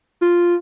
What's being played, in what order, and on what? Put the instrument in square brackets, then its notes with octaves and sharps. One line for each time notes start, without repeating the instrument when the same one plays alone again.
[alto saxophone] F4